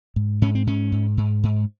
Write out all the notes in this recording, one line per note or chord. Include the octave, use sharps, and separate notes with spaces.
G#2
G#2 C#4
C4
G#2 C#4
G#2
G#2
G#2